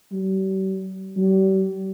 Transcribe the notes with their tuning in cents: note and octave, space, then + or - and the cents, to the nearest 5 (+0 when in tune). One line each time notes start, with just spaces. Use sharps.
G3 -45
G3 -40